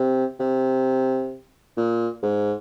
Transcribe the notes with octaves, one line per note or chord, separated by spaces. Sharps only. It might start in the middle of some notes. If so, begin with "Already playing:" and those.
Already playing: C3
C3
A#2
G#2